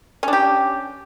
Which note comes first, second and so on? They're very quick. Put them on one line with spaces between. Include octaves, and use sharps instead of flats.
C#4 D4 G4